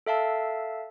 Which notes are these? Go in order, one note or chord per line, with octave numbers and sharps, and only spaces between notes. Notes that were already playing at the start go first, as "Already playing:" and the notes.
A4 E5 F5 A5